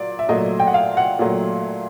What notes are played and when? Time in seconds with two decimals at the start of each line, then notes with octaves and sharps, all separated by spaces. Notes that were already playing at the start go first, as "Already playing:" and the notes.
Already playing: A#2 F#3 D5
0.19 E5
0.29 A#2 F#3 A3 D#5
0.60 G5
0.67 F#5
0.74 F5
0.97 F#5
1.19 A#2 F#3 A3